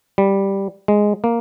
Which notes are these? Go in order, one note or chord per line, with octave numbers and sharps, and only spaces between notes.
G3
G#3
A#3